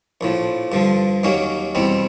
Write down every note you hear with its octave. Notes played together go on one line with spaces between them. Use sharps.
A#1 A2 F3
G2 D3 F3
D#2 D#3 F#3 A#3 C#4
E2 B2 G3 C4